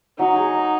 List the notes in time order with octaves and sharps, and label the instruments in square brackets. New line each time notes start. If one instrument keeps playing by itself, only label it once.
[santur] F#3 [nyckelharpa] D#4
[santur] G#4
D#5